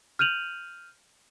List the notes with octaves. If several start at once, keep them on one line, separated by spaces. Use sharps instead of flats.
F6 G6 D#7 F7 F#7